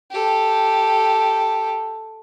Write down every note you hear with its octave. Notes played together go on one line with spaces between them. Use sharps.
G4 A4